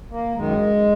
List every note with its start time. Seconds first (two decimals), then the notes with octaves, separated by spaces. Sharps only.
0.11 A#3
0.36 F#2 D#3 G#3